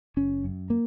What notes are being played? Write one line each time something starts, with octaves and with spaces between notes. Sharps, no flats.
F#1 C#4
F#2
A#3